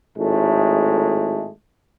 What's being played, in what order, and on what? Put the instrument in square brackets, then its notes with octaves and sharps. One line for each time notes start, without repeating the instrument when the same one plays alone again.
[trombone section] G#1 A2 G#3 A3